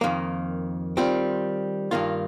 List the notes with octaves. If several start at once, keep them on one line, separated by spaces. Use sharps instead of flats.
F2 D#3 A#3
D#3 G3 C4 F4
G2 D#3 A#3 F4